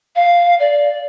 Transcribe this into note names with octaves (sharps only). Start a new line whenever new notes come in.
F5
D5